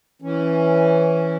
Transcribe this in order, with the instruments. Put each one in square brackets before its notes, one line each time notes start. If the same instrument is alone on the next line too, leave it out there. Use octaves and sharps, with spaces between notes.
[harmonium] E3 C#4